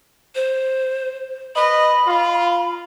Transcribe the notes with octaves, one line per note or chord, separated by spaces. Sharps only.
C5
B4 D#5 B5
F4